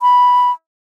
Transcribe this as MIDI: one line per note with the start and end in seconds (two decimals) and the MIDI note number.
0.02 0.51 83